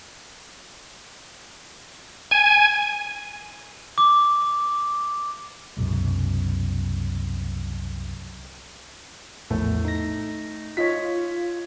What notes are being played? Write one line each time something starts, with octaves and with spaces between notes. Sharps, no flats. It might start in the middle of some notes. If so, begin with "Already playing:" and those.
G#5
D6
C2 F#2 B2 G#3
A#1 E2 A2 A3
D#4 A#6
F4 C#5 D#5 B6